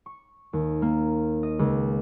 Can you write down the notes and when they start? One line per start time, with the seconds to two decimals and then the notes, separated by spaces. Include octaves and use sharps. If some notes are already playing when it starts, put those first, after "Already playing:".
0.06 C#6
0.53 D#2
0.82 A#3
1.43 D#5
1.59 C#2